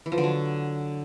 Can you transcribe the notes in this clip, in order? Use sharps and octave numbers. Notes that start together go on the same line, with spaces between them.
E3
F3
D3
F#3